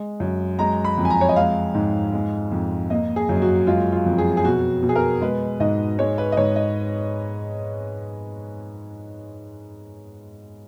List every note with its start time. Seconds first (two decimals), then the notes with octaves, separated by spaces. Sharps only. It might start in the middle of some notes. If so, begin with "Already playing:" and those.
Already playing: G#3
0.20 F#2
0.59 G#3 A#5
0.85 B5
0.98 F2
1.05 G#5
1.10 A#5
1.21 C#5
1.29 D#5
1.36 G#3 F5
1.74 G#2
2.13 G#3
2.52 F2
2.90 A#3 D#5
3.16 G#4
3.29 F#2
3.42 F#4
3.67 G#3 F4
3.93 F4
4.06 F2
4.18 G#4
4.37 G#4
4.44 B2 F#4
4.83 B2
4.89 G#4
4.96 A#4
5.21 G#3 B4
5.60 G#2 D#5
5.99 G#3 C#5
6.18 B4
6.32 D#5
6.37 G#2 C#5
6.56 D#5